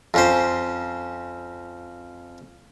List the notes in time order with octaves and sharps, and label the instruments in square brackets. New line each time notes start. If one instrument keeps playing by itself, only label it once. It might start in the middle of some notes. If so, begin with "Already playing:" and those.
[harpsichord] F2 C#4 C5